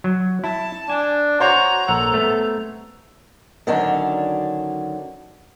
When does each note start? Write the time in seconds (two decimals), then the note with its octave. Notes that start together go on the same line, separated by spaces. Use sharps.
0.04 F#3
0.44 E4 A5
0.90 D4 G#5
1.40 F#4 C5 C#5 A#5
1.88 A#1 A4 F#5
2.14 A3 B3
3.67 D3 D#3 F#3 C#4 D4